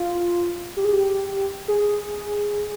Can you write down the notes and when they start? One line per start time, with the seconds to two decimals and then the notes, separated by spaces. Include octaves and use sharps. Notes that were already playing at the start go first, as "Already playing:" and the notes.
Already playing: F4
0.77 G4
0.85 G#4
0.93 G4
1.68 G#4